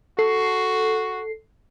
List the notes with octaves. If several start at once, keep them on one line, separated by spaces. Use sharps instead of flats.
F#4 A4 C7